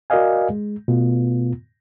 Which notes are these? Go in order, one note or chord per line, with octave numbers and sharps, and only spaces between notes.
F#4 A#4 D5 D#5 F5 G#5
G#3
B2 A3 B3 F4